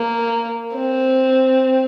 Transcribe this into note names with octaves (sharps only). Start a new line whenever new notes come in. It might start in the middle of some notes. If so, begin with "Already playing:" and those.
Already playing: A#3
C4